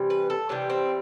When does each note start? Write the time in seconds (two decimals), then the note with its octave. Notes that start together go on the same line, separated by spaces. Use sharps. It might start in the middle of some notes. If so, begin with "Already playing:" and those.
Already playing: C3 E3 G3
0.10 B4
0.30 A4
0.49 C3 E3 G3 D4
0.70 C4